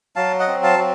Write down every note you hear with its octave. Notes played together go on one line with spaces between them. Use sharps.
F#3 F5 A5
D#5 F#5
C4
F5 A5
F#3